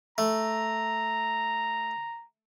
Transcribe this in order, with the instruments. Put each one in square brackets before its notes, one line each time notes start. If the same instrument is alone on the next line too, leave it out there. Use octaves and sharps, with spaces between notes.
[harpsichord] A3 [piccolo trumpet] A#5